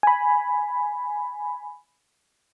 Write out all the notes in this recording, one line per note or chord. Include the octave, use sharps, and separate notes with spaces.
G#5 B5